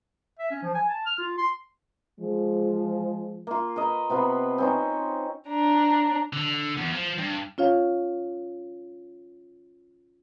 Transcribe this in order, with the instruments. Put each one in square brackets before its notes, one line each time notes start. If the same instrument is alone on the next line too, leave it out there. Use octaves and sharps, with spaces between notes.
[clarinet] E5
C#4
F3
G#5
A5
F6
F4
C6
[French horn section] F3 G#3
[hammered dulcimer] A#3 F4
A#4 B4 D#5
C3 B3 F4 B4
C4 C#4 D#4
[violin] D4 A#5
[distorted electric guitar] D3
E2
F3
G2
[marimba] C#4 F4 C#5 F5